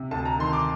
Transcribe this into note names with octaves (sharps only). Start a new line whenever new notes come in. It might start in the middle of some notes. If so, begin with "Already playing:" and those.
Already playing: C3
D2 A5
A#5
D#3 C6
D6